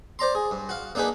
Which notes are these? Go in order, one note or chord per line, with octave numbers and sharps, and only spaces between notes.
C5 D5 A#5 C6
G#4
G2
F#4 F5
A#3 D4 D#4 G#4 B4